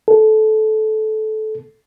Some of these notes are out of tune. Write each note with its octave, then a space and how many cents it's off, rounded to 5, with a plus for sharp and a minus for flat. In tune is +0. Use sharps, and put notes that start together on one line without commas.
A4 -20